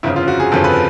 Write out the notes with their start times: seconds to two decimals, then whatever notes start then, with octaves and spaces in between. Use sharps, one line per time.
0.03 G1 F2 C#3 E4
0.16 F4
0.28 F#4
0.40 G#4
0.52 G1 F2 C#3 A4
0.64 B4